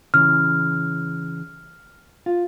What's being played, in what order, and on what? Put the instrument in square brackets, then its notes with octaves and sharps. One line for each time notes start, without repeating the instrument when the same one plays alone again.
[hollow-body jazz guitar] C#3 E3 [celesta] F6
[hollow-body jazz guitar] F4